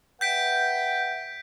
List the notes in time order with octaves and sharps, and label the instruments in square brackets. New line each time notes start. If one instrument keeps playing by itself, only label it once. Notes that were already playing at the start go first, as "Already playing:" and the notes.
[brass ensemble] B4 E5 F#5 [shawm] G5 [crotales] G6 B6 D7